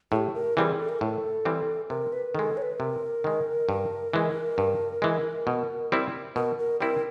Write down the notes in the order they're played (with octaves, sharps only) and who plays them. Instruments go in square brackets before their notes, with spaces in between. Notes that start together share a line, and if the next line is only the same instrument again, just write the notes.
[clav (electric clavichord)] A2 [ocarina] G4 G#4
[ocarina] A#4
[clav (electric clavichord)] E3 G3 C4 [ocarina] G#4
[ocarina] A4
A#4
[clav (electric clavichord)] A2 [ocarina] A4
[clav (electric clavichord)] E3 G3 C4
[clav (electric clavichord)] C3 [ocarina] A#4
[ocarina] B4
[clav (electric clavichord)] D#3 G#3 [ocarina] A4
[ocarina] C#5
B4
[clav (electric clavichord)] C3 [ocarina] A#4
[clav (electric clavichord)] D#3 G#3
G2
E3 G#3
G2
E3 G#3
B2
G3 C4 E4
[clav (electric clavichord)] B2 [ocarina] A#4
[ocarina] A#4
[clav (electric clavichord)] G3 C4 E4 [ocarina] A#4